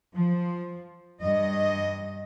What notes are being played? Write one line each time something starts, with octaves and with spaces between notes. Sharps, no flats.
F3
G2 D#5